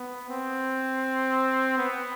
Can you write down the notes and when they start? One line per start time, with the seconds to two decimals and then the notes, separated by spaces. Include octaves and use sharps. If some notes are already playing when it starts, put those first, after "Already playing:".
Already playing: B3
0.29 C4
1.77 B3